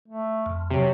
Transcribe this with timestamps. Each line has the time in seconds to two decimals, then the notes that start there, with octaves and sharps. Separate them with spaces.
0.08 A3
0.46 F2
0.70 C3 F#3